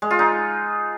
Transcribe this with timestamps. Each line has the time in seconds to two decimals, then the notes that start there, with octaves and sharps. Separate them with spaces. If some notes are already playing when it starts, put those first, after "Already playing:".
0.02 G#3
0.10 F4
0.19 D#4